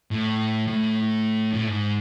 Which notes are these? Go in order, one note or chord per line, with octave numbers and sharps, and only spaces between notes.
A2
A2
A2
G#2